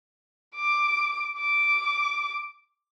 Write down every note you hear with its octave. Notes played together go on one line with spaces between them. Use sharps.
D6
D6